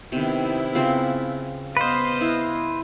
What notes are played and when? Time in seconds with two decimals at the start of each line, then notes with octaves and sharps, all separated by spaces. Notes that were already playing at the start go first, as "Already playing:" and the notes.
0.12 C3 D#3 B3 E4
0.75 C#3 C4 F4
1.77 B3 B4 C5 D#5 F5
2.21 E4